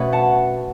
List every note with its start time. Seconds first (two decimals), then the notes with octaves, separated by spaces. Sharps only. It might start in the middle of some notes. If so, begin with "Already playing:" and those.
Already playing: B2 A3 B3 C#4 B4
0.12 F#5 A5